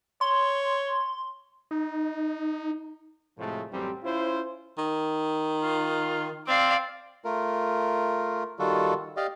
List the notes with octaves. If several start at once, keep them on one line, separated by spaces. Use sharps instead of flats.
C#5 C6
D#4
A2 C3 F3 G#3 A3
A1 F#2 G3 C4 G4
C#4 E4 F4 C5
D#3
F4
C4 D5 F5
A3 F4 A#4
D#3 G3 F4 F#4 A4
G4 D5 D#5 F5